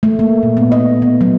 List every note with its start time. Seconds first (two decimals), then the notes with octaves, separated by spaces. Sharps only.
0.03 A3
0.19 A#3
0.43 A#2
0.57 B3
0.72 D#5
1.02 B3
1.21 F#3